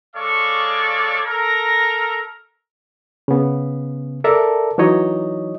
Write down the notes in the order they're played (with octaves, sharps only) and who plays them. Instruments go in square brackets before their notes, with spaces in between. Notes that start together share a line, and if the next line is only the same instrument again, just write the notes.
[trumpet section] G#3 A4 C#5 D5 F5 C#6
A4 A#4 A#5
[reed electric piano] C#3 B3
A4 A#4 D5 E5 A5 A#5
E3 F#3 D#4 C#5 D#5